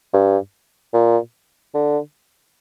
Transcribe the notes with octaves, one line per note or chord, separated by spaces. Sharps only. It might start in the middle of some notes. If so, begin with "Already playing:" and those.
G2
A#2
D3